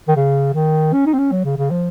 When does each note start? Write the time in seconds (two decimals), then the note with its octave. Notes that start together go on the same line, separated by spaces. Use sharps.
0.08 D#3
0.16 C#3
0.54 D#3
0.93 C#4
1.06 D#4
1.13 C4
1.18 C#4
1.32 F#3
1.44 C#3
1.57 C#3
1.70 F3